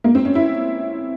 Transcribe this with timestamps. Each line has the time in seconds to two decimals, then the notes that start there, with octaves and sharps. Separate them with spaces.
0.04 A#3
0.15 C4
0.25 C#4
0.35 E4